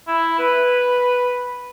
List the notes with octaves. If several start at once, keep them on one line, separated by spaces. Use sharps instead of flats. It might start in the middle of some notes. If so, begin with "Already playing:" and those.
E4
B4